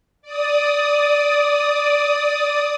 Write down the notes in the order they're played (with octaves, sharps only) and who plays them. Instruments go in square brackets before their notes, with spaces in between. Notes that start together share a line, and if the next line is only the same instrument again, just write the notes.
[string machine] D5 D#6